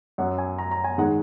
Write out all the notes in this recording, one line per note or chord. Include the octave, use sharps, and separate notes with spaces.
F#2 F#3 F#5
G#5
A#5
A#5
G#5
G#2 D#3 G#3 F#5